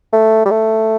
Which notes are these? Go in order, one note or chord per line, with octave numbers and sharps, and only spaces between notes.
A3
G3
A3